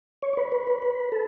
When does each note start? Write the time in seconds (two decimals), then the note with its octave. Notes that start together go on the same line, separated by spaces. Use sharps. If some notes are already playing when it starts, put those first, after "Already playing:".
0.22 C#5
0.33 C#5
0.37 B4
0.52 B4
0.67 B4
0.82 B4
1.12 A4